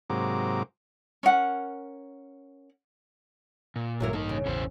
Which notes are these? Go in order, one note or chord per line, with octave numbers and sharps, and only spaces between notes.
G#2 C3 F#3 A#3 D6
C#4 A#4 F#5
A#2
A1 G2 F#3 E4 A#4
A#3 D#4 A4
C#3
A1 E2 B2 C#4 E4 C5